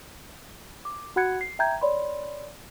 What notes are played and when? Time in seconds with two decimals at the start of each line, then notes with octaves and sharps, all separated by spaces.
0.85 D6
1.16 F#4 F#5 B5 F#6 G#6 C#7
1.41 C7
1.59 E5 G5 A#5 G6 G#6
1.81 C#5 D5 B5 C6